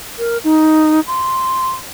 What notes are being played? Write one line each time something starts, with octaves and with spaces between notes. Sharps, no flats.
A#4
D#4
C6